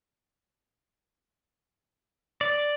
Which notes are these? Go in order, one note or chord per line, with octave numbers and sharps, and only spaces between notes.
D5